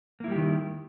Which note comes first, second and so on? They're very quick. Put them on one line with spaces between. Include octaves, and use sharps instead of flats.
A#3 E4 G3 G4 D#3